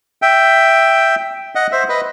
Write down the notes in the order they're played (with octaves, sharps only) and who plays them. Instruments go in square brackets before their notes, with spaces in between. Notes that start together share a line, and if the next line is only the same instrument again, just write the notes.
[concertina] E5 G5
D#5 F#5
C5 E5
B4 D#5